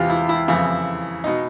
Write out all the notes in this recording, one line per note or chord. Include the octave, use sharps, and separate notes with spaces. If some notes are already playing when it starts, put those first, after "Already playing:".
Already playing: E2 C3 E3 F4 G4
E4
E4
F2 C#3 E3 E4
B2 D#4